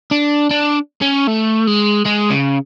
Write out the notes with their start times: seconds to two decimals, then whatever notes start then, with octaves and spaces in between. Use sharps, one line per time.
0.11 D4
0.51 D4
1.01 C#4
1.27 A3
1.67 G#3
2.06 G#3
2.31 C#3